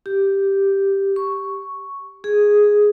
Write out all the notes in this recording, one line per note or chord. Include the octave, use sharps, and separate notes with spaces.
G4
C#6
G#4